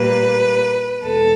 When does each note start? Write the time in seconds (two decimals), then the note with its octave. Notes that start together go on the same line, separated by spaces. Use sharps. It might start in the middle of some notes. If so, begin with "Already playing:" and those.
Already playing: A#2 G3 A#3 B4
1.04 E2 B2 G#3 A4